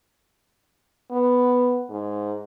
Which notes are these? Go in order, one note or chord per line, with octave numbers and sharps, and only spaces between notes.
B3
G#2